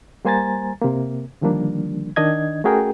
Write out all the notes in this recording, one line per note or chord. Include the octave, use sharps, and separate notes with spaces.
G3 A#3 C5 G#5 A#5 A6
C3 A#3
D3 D#3 F3 G3 A#3 D4
D#3 D4 D#5 G#6
A3 C#4 F#4 G#4 A#4 G5